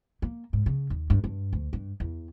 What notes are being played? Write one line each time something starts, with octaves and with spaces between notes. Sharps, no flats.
A#3
G#2
C#3
D#2
G2
G2
D2
G2
E2